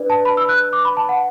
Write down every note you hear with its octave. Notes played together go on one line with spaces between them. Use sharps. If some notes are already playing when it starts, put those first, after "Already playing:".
Already playing: D4 B4 D5
A5
B5
E6
F#6
D6
B5
A5
F#5